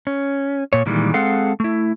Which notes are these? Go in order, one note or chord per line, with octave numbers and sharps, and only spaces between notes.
C#4
A#2 C#5
A#2 D#3 E3 G3 G#3
G#3 C4 G#4 A4 F5 F#5
A3 E4